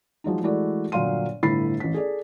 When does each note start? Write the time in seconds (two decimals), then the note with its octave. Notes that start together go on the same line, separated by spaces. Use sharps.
0.24 F3 F#3 G#3 D#4
0.42 E3 G#3 A3 E4 F#4 D5
0.92 G1 A#2 F#3 F5 C6 D#7
1.43 G1 A2 E4 B5 A6 C7
1.80 A1 B6
1.94 G#4 A4 D5